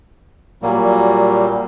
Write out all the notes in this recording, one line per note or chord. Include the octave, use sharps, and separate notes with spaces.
A#2 F#3 G3 A#3